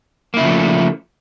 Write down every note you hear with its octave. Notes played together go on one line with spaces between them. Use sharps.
C#3 F3 A3 A#3 E4